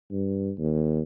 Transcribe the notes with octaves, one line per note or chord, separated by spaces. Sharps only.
G2
D#2